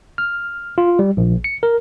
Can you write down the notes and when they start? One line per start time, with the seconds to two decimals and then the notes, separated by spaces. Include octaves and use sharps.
0.18 F6
0.78 F4
0.99 G3
1.17 A#1
1.44 C#7
1.63 A#4